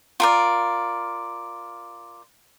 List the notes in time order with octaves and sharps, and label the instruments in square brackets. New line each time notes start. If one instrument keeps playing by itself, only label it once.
[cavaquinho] F4 A#4 D5